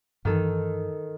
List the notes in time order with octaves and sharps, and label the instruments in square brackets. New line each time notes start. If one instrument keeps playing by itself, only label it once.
[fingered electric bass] G2 E3 [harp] D#3 A4